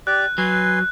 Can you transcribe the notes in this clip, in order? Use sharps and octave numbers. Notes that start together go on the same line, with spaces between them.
G4 D5 F#6
F#3 B4 G#5 C6